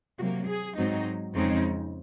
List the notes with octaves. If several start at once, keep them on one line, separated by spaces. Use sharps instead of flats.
C3 F#3 A#3 F#4
G#4
G#2 F#3 C4 D#4
F2 C#3 G#3 C4 D#4